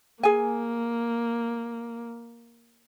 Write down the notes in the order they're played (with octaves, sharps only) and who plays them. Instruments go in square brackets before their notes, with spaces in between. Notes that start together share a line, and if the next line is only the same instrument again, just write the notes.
[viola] A#3 [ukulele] G#4 G#5